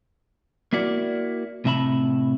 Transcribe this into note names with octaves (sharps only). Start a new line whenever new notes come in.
A#3 E4 F#4 D5
A2 C3 E5 A5 B5